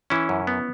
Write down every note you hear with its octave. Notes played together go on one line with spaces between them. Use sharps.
E3 C#4 E4
F#2
B3